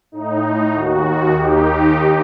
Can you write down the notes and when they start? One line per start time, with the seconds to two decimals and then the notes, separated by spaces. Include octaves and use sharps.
0.12 A2 D#4
0.72 D#2 D#3 F#4
1.34 D#2 D#3 D#4 G4